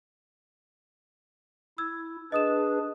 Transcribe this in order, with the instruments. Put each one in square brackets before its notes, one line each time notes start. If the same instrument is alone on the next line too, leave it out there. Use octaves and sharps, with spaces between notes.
[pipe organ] E4 [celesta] E6 G#6
[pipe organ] D4 G#4 B4 [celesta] D#5 D#6 E7